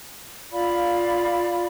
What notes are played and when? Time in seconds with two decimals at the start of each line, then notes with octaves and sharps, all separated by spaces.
0.52 F4 D5 F5 B5